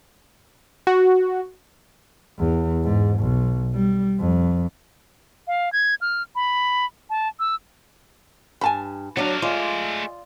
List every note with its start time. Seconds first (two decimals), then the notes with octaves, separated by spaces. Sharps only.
0.87 F#4
2.38 E2
2.83 G#2
3.19 B1
3.74 G3
4.20 F2
5.48 F5
5.73 G#6
6.01 F6
6.35 B5
7.10 A5
7.40 E6
8.61 G2 G#5 A5 B5
9.17 F#3 A3 D4 F5
9.42 G#3 F4 D5